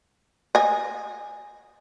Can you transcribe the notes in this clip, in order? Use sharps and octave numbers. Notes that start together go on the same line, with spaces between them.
D#5 G#5